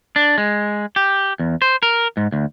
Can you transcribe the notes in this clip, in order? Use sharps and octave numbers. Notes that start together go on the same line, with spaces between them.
D4
G#3
G4
E2
C5
A#4
G#2
D2